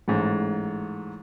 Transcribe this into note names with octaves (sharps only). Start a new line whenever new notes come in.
A1 G#2